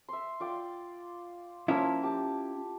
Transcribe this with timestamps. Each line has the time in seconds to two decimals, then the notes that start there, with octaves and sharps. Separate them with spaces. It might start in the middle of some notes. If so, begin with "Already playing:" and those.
0.09 E5 C6
0.40 F4 D5 G5
1.68 F3 A#3 C#4 E4 A#4
2.03 G4 A5